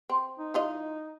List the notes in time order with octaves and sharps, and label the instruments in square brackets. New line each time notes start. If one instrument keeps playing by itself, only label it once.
[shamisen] C4
[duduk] D#4
[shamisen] E3 F4 D#5